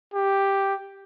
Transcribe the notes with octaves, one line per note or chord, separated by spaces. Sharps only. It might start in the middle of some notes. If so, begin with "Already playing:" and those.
G4